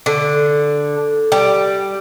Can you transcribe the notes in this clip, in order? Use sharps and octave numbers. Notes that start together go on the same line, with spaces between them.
D3
G3